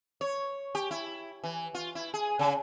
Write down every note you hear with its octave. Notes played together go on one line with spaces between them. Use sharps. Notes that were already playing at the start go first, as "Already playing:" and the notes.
C#5
G4
E4
E3
F4
E4
G#4
C#3